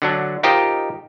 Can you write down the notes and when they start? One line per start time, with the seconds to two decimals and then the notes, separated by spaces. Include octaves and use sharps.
0.02 D3 F#3 D4
0.43 D#4 F4 G4 A#4 C5 D#5